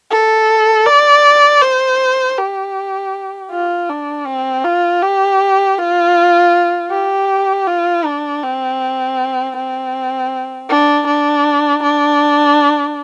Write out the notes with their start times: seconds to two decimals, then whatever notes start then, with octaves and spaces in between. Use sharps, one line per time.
0.11 A4
0.86 D5
1.62 C5
2.38 G4
3.51 F4
3.89 D4
4.27 C4
4.64 F4
5.03 G4
5.78 F4
6.91 G4
7.67 F4
8.05 D4
8.43 C4
9.57 C4
10.70 D4
11.07 D4
11.83 D4